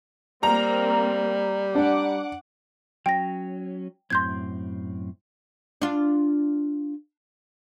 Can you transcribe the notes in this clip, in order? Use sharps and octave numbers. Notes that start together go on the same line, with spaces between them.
G3 A#3 C4 A#5
D4 F#5 D6
F#3 C#4 G5 A#6
F#2 A2 C4 C6 G6 G#6
D4 F4